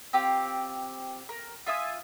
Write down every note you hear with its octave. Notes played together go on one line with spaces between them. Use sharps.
C4 F4 G4
A#4
F4 E5 G#5 D#6